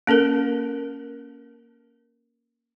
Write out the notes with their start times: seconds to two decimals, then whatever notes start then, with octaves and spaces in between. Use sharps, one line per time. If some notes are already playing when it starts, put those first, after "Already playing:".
0.07 A#3 C#4 A4 A#4